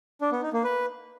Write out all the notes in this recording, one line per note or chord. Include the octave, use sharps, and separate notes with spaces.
D4
B3
D#4
A#3
B4